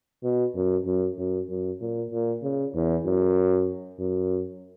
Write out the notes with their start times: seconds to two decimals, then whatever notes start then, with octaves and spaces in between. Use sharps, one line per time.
0.23 B2
0.55 F#2
0.85 F#2
1.18 F#2
1.49 F#2
1.80 A#2
2.11 A#2
2.43 C#3
2.74 E2
3.05 F#2
3.99 F#2